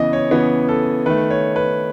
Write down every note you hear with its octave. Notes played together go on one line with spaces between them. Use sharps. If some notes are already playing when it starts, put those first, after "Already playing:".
Already playing: C#3 E3 B3 D#5
C#5
C#3 E3 B3 C#5
A4
D#3 A3 B4
C#5
B4